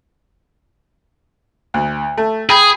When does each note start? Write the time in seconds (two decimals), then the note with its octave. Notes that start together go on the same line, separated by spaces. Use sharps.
1.74 D2
2.17 A3
2.50 G#4 G5 B5